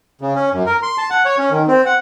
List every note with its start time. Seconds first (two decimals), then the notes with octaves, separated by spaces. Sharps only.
0.21 C#3
0.35 C#4
0.53 F#2
0.66 A#4
0.83 C6
0.98 A5
1.11 F#5
1.25 C#5
1.38 C#4
1.51 D#3
1.68 C4
1.86 F#5